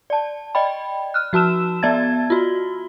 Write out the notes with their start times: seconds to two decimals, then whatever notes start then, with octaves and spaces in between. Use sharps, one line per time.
0.10 D5 A5
0.55 D5 D#5 G5 B5
1.14 F6 F#6
1.33 F3 F#4 A5 E6 E7
1.82 B3 D5 E5 A5 G#6 A6
2.30 F4 F#4